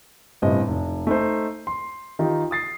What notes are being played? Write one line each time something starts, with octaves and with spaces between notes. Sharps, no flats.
G1 A2 C3 D#5
F1
A3 D#4 C5
C6
D#3 D#4 F4 G4
D#6 A6 C7